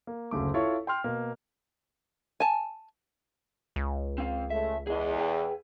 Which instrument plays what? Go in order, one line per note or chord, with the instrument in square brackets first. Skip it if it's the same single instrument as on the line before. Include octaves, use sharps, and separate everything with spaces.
[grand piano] A#3
F#1 D2 C#3 A3 D6
E4 F4 A4 C#5 F5 C#6
G5 C6 F6
B2 A#3
[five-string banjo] G#5 A5
[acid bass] C#2
[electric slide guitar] C4 F5
[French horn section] C#3 G#3 A3 [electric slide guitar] E5
[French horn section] E2 [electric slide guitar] G#4 D#5
[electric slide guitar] G#4 B4 G5